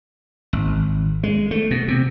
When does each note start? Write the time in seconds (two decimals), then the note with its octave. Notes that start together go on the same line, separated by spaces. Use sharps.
0.53 G#1
1.23 G#3
1.51 A3
1.71 B2
1.88 C3